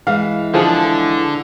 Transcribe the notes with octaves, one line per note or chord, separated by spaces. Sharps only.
E3 G#3 F5
D3 F3 G#4